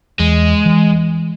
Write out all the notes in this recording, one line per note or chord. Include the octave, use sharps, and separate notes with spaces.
E2 G#3
E3